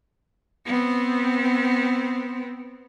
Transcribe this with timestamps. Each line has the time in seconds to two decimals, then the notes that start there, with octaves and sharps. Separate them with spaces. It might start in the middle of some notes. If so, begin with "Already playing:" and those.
0.66 B3 C4